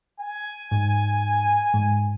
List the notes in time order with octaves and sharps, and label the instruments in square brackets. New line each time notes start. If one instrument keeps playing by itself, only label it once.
[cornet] G#5
[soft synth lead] G#2
G#2